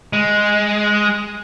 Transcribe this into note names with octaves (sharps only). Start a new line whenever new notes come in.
G#3